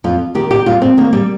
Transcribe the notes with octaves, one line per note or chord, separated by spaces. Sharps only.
F2 F4
D#3 G4
G4
G2 F4
C4
D#3 A#3
G3